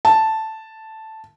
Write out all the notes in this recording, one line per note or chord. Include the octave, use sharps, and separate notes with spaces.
A5